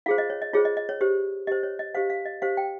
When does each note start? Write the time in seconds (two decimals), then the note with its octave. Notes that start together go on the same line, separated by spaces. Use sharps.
0.06 F4 G#4 C5 F5
0.18 D#5
0.30 C#5
0.42 D#5
0.54 F4 G#4 C5 C#5
0.65 D#5
0.77 D#5
0.89 C#5
1.01 G4 C5
1.47 G4 C5 D#5
1.63 C#5
1.79 D#5
1.95 G4 C5 F5
2.10 F5
2.26 D#5
2.42 G4 C5 F5
2.57 G5